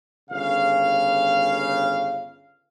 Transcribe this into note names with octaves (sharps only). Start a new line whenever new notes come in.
G1 C#3 F5